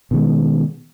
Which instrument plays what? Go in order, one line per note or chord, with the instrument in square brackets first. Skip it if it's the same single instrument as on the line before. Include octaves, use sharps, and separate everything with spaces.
[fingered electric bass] B2 D#3 G#3